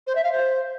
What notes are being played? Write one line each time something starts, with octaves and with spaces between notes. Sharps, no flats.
C5
E5
F5
C5